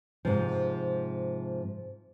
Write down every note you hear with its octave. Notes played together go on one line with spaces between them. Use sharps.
G#2 C3 F3